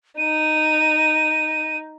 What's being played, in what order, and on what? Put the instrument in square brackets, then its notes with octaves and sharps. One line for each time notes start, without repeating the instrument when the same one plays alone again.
[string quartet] D#4 [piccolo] D#7